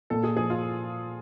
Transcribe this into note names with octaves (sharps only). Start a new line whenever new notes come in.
A#2 A4
G#4
F3 G#4
F4